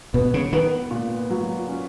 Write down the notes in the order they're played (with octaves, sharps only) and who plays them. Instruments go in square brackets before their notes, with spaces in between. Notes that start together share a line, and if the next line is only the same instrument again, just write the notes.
[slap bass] B2 [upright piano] B3
[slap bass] C#3
[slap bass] D#3 [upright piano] B3
[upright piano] A#2
F#3
C#4